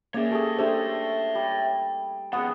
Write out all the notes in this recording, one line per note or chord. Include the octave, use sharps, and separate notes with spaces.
A#3 C#4 G#4 C#5 D5 E5
A3 G4 G#4
A3 D4 G4 C5 C#5 E5
G3
F2 B2 B3 G#4 F#5